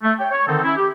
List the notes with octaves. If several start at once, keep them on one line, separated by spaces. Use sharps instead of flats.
A3
C#5 G5
C#5
D3 D#3 C4 D#4 A4
C#4 E4
G4